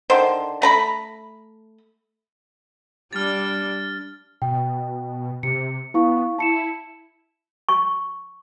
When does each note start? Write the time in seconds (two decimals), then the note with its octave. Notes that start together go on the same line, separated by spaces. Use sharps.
0.10 D3 D#3 C5
0.62 A3 A#5 B5
3.13 G3 D4 F6 A6
4.42 B2 G5
5.43 C3 C#7
5.94 B3 E4 F5 C#6
6.38 E4 A5 C#7 E7
7.69 C#6